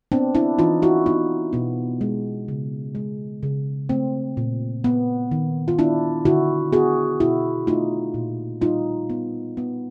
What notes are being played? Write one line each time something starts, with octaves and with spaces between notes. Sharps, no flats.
B3 C4 D4
D4 E4
E3 D#4 F4
E4 F#4
B3 D#4 F4
B2 B3
G#3
C#3
G#3
C#3
A3 C4
A#2
B3
D#3
F4
B3 D4 E4
D3 E4 F#4
B3 F#4 G#4
B2 E4 F#4
A3 D#4 F4
A#2
G3 D#4 F4
B3
B3